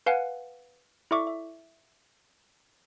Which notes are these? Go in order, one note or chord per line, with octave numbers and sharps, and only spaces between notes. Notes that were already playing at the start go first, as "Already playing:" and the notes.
B4 F5 F#5 G#5
E4 A4 D5 E5 C#6 D6
E5